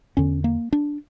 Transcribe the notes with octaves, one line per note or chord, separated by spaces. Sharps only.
E2 D3 C#4
A#3
D4